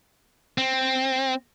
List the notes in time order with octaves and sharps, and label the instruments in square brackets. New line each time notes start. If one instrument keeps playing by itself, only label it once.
[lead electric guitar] C4